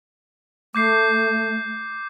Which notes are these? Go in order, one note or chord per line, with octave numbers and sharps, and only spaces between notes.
A3 D6 G6 C7